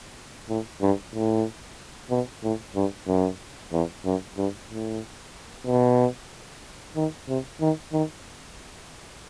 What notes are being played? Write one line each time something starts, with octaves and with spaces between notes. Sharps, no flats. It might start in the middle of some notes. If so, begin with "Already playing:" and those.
A2
G2
A2
B2
A2
G2
F#2
E2
F#2
G2
A2
B2
D#3
C3
D#3
D#3